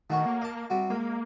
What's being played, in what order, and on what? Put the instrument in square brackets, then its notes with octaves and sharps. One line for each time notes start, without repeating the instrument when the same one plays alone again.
[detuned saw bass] D#3 [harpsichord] A3 F#4 C#5
[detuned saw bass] A#3
[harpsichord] D#5 A5
C3 G3 F#4
[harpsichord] G#3 [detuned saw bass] A#3